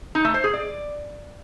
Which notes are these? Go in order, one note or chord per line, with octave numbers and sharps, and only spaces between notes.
D#4
A3
C5
G#4
D5